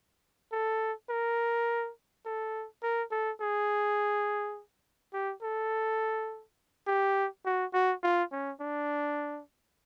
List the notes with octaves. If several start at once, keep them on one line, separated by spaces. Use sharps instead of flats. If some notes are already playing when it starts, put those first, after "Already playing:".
A4
A#4
A4
A#4
A4
G#4
G4
A4
G4
F#4
F#4
F4
C#4
D4